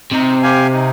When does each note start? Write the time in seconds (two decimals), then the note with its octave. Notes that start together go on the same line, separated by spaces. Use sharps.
0.13 C3 D#4
0.43 G4 C5 F5 G#5
0.73 D#4